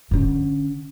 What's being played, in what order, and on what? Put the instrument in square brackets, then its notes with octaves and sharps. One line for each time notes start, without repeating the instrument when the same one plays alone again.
[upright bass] D3 C#4